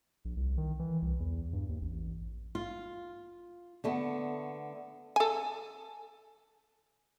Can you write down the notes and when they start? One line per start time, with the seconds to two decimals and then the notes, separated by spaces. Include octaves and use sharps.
0.25 A#1
0.37 C2
0.58 D#3
0.79 E3
1.02 C2
1.20 E2
1.53 G2
1.69 D#2
1.82 A1
2.55 F4
3.84 D3 A3 B3
5.16 A4 G#5